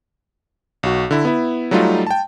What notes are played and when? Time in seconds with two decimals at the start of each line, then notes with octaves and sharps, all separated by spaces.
0.83 B1 F#4
1.11 D3 E4
1.25 B3 E4
1.71 F#3 G3 A3 D#4 F4
2.07 G5 A5